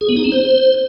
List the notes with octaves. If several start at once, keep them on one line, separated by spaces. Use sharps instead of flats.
G#4
B3
D#4
C4
C5